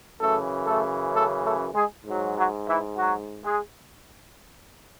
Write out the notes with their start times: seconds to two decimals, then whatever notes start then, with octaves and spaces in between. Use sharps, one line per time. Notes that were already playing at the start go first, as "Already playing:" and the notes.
0.21 F#2 C#3 E3 A3 A4
0.67 A3 A4
1.14 A3 A4
1.44 A3 A4
1.74 G#3 G#4
2.06 G#2 F#3
2.36 F#3 F#4
2.67 E3 E4
2.98 F#3 F#4
3.44 G#3 G#4